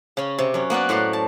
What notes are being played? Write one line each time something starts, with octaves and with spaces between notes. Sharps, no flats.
C#3 C#4
C3
F#2 C#4
A#3 B3 F#4 D5
A2 C5 F#5 C6
A5